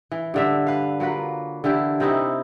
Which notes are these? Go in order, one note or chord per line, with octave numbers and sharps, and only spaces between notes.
E3
G2 D3 E5
B4 F5
F#3 A#3 F4 B4
D3 E3 E4 G4
C3 C4 D#4 E4